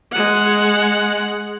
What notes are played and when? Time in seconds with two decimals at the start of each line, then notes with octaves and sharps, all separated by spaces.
0.12 G#3 F#5